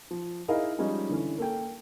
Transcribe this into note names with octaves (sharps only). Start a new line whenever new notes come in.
F3
D#4 E4 G#4 A#4 D#5 F5
F3 G3 G#3 C#4 D#4
D3 E3 C#4
A#3 A4 G5